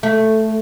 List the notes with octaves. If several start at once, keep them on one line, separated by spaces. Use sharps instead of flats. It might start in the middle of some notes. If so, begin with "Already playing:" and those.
A3